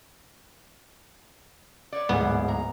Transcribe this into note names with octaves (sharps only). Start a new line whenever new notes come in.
B4 C#5 D5
D1 G#2 B3 G#4
A#5